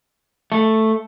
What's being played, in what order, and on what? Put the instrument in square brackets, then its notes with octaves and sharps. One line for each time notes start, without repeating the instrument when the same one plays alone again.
[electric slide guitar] A3